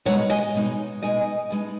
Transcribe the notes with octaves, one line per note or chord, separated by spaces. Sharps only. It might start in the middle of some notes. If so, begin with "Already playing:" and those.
B2 G#3 D#4 C#5 F#5
D#5 G#5
B2 G#3 D#4
B2 G#3 D#4 D#5 G#5
B2 G#3 D#4